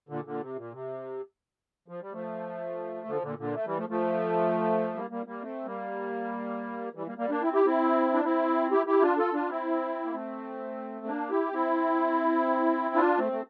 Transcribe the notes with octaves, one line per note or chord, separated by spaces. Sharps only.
A#2 D3
A#2 D3
C3
A#2
C3
F3
G3
F3 A3
D3 F3
A#2 D3
A#2 D3
A3
E3 G3
F3 A3
F3 A3
G3 A#3
G3 A#3
G3 A#3
A3 C4
G3 A#3
E3 G3
G3 A#3
G3 A#3
A#3 D4
C4 E4
E4 G4
C4 E4
D4
C4 E4
E4 G4
E4 G4
D4 F4
F4 A4
D4 F4
C4 E4
A#3
A3 C4
A#3 D4
E4 G4
C4 E4
D4 F4
A3 C4
A3